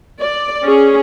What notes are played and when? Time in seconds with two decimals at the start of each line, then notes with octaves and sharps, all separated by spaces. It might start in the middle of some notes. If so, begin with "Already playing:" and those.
0.21 D5
0.64 C#4 G#4